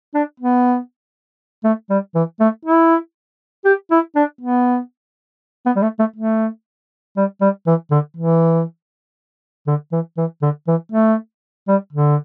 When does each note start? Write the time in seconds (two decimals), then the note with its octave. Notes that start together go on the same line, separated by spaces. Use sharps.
0.15 D4
0.40 B3
1.64 A3
1.90 G3
2.15 E3
2.40 A3
2.65 E4
3.65 G4
3.91 E4
4.16 D4
4.41 B3
5.66 B3
5.76 G3
5.83 A3
5.99 A3
6.16 A3
7.17 G3
7.41 G3
7.67 E3
7.91 D3
8.17 E3
9.67 D3
9.92 E3
10.17 E3
10.42 D3
10.68 E3
10.92 A3
11.68 G3
11.93 D3